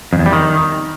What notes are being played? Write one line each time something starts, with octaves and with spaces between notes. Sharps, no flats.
F2
E2
G3
D#3